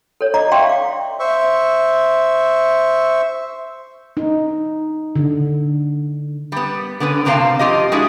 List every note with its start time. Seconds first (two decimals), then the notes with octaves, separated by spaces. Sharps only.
0.21 A4 C#5
0.34 D5 D#5 A#5 D6
0.52 D5 E5 F5 G5 C6 C#6
0.67 F5 D6
1.20 C5 E5 C#6
4.17 D#4
5.16 D3
6.52 G3 B3
7.00 D3 B3 C#4 B4
7.25 A2 C3 C4 A4 F5 A5
7.59 F2 F4 G4 D#5
7.92 G#3 D4 E4 F#4 G#4